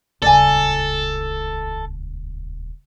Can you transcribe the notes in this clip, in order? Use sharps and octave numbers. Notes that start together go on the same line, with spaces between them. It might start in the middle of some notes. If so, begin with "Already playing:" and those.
D#1 C#2 A4 D5 G#5